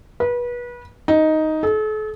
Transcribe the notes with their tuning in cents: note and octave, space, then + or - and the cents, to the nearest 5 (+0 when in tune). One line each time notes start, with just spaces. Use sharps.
B4 -30
D#4 +5
A4 -40